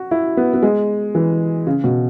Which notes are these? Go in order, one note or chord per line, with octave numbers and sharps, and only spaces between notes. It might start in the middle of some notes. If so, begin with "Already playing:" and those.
Already playing: F#4
E4
B3
B3
G#3
E3
C#3
B2